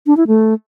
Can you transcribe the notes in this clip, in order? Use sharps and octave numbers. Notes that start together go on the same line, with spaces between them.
D4
E4
A3